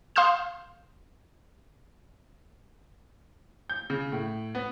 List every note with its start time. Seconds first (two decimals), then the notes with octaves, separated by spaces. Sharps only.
0.16 F5 C6 D#6 F6 G6 E7
3.70 G6
3.90 C#3
4.12 A2
4.55 B3